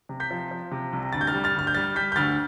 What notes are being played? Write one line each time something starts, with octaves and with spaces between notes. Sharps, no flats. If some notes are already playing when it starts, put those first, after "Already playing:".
C3
G6 B6
F3
F3
C3
C2
D2 A6
G6
F6 A6
G3
F6 A6
D2 F6
G6
G3 F6 A6
G3 G6 B6
G6
D2 F6 A6